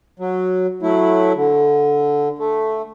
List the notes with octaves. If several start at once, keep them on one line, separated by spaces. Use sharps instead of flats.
F#3
F#3 A3 E4
D3
A3